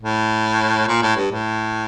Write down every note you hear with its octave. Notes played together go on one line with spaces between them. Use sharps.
A2
A#2
A2
G2
A2